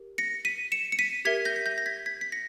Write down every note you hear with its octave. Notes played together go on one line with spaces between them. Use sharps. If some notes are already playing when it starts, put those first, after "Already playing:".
Already playing: G4 A#4
A#6 C#7
B6 D#7
C#7 E7
C#7
B6 D#7
G4 A#4 E5 G#6 B6
G6 A#6
B6
G6 A#6
A#6
G#6 B6
G#6 B6
B6
A#6 C#7